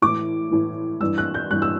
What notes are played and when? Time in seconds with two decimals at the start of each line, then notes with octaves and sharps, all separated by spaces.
0.02 A2 E3 D6
0.51 A2 E3
1.01 G2 E3 E6
1.18 F#6
1.34 G6
1.51 G2 E3 F#6
1.62 E6